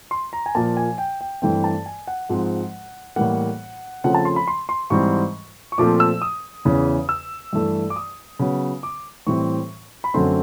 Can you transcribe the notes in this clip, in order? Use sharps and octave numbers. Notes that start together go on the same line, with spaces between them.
C6
A#5
G#5
A#2 F3 A#3 A5
G#5
G5
G5
G2 E3 A3 C4 G5
A5
G#5
F#5
G#2 F3 G#3 C4
A2 E3 G3 A#3 F#5
C#3 F3 A3 C4 F#5
A5
C6
B5
C6
C6
G#2 E3 G3 C4 C#6
C#6
A#2 F3 A3 C4 D6
E6
D#6
E2 C#3 E3
E6
G2 E3 A3
D6
D#6
C#3 F#3 B3
D6
A2 E3 G3 C4 C#6
B5
F#2 D3 F#3 A3 C4 C6